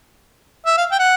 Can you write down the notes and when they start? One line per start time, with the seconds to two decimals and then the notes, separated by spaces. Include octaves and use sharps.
0.66 E5
0.77 F5
0.91 G5
0.99 F#5